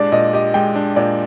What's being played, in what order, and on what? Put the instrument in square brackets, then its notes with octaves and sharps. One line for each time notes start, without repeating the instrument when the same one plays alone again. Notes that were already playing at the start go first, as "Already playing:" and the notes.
Already playing: [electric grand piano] A#2 G#3 D4 G4 [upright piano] D5
[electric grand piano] A#2 [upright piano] D#5
[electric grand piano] G4 [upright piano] D#5
[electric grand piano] G#3 [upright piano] G5
[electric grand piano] D4
[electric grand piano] A#2 [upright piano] D5